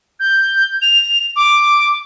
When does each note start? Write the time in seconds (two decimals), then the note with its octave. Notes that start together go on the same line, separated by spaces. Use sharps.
0.20 G6
0.82 F7
1.36 D6